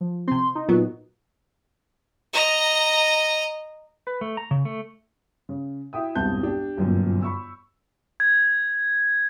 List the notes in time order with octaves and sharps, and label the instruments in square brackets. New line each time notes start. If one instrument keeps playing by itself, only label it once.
[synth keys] F3
[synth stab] C3 C4 [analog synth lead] C6
[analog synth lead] D#4
[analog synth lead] A#2 [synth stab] F#3 B3 [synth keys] D#4 F#4
[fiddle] D#5 A#5
[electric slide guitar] B4
A3
A#5
C#3
A3
[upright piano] C#3
E4 F#4 E5 G5 D#6
E1 C2 G2 C4 A5 G6
D4 G4
G1 F#2 A#2
B5 C#6 E6
[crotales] G#6